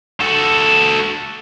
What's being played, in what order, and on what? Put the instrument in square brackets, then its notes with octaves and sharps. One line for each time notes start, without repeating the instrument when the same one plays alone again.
[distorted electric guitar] F#4 A4